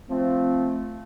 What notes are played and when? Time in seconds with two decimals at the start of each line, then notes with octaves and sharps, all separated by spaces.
0.09 F3 A3 C4